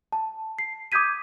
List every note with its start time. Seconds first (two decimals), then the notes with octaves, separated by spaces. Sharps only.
0.12 A5
0.59 C7
0.92 D6 D#6 G6 G#6 B6 D#7